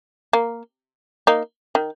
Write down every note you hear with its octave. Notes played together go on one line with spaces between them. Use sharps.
A#3
A#3 D#4
D#3